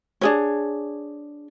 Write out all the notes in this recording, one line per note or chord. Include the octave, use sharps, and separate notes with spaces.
D4 G#4 C#5